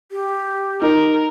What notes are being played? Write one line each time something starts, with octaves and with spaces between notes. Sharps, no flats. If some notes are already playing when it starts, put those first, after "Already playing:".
G4
D#4 A#4